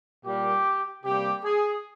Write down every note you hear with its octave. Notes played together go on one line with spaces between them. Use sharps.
A#2 G3 A#3 G4
C3 G3 A#3 G4
G#4